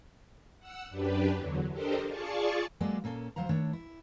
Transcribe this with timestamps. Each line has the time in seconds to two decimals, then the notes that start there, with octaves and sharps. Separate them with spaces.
0.59 F#5 E6
0.89 F#2 D4 G4 B4
1.35 E2 D3 F#3
1.71 D4 G4 A4 A#4 C5 D#5
2.07 F4 G#4 D5 A5 C#6
2.80 F#3 G#3 A#3 G#4 A4 D5
3.04 A#2 A#3 C#4 A4
3.36 D2 F#3 C5 F5 A#5
3.49 D#3 A3 D4 C#5
3.73 E4